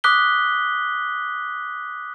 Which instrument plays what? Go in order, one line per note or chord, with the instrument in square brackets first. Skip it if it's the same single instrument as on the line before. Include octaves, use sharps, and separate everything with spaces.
[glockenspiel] D6 D#6 F#6 B6 G7